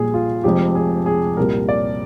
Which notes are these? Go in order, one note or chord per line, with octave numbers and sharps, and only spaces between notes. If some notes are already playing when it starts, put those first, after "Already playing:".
Already playing: A#1 A#2 G3 G#4
F4
F1 F2 C3 F3 G#3 G4
G#4
G#4
C2 A#2 G3 A#4
D5